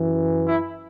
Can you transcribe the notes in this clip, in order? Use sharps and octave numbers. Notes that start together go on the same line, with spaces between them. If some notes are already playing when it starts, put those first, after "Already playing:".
Already playing: F#2 E3
E4